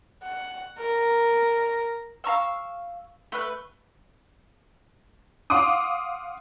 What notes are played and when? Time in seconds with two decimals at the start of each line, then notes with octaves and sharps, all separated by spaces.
0.23 F#5
0.78 A#4
2.24 F5 A#5 C#6 E6
3.32 A3 B4 F#6
5.50 F5 F#5 C6 D6 D#6